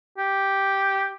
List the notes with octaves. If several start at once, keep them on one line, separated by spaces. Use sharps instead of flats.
G4